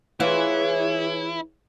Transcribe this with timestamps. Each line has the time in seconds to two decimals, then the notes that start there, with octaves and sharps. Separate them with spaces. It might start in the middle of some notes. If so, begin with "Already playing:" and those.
0.20 E3 E4 F4 G#4 C#5